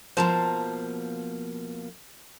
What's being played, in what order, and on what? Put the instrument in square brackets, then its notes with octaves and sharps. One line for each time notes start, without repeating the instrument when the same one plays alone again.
[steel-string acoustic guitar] B2 F3 A#3 [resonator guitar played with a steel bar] C5 A5 A#5